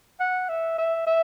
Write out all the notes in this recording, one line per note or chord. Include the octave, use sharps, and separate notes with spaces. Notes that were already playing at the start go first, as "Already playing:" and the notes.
F#5
E5
E5
E5